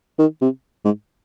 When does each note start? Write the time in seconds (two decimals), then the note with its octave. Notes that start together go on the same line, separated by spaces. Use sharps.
0.19 D#3
0.41 C3
0.85 G#2